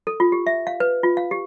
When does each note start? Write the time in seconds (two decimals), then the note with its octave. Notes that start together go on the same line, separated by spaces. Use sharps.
0.07 A4
0.20 F4
0.32 G4
0.47 E5
0.67 F5
0.80 B4
1.03 F4
1.17 F5
1.31 G4